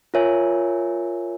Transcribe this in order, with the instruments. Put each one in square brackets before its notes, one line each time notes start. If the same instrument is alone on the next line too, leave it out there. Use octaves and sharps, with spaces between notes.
[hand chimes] F4 A#4 C#5 E5 G#5